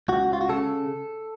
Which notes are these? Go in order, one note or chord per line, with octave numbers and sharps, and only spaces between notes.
C#2 F#4
F4
F#4
C#3 A4